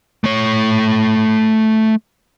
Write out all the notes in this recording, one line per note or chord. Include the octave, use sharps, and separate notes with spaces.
A3 C#5